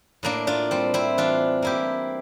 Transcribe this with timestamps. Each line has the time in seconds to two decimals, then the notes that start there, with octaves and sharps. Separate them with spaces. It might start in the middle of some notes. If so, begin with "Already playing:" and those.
0.23 A2 A#3 D4
0.47 D4 F4
0.71 G3 C4
0.94 C4 E4
1.18 E3 D4 F4
1.62 A#3 E4 G4